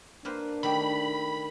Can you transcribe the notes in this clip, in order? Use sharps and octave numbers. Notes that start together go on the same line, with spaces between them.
A#3 D4 B4 C5
D#3 A3 G4 B5